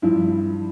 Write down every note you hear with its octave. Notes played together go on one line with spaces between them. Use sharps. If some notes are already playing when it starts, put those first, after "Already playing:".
G2 F3 E4